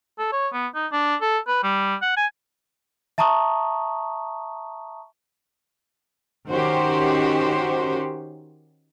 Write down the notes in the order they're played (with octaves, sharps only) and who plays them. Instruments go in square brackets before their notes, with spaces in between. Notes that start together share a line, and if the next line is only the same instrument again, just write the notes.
[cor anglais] A4
C#5
B3
D#4
D4
A4
B4
G3
F#5
G#5
[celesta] E5 A5 A#5 C#6 D#6
[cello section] D#3 C#4 F#4 G4 C5